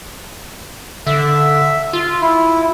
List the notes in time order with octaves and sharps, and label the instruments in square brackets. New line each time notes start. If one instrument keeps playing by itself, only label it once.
[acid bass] D3 [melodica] E5
[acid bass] F4
[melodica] E4